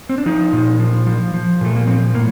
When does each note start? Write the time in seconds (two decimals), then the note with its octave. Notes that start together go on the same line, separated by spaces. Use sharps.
0.09 C4
0.18 D4
0.26 F3 D#4
0.53 A#2
0.80 F3
1.07 F3
1.34 F3
1.61 A#2 A3
1.76 A#3
1.87 F3 C4
2.14 A2 A#3